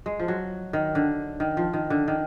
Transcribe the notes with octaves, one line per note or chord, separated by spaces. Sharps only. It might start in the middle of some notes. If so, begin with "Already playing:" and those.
G#3
F3
F#3
D#3
D3
D#3
F3
D#3
D3
D#3